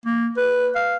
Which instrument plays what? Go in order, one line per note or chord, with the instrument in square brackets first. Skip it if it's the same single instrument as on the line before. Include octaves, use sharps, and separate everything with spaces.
[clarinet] A#3
B4
F5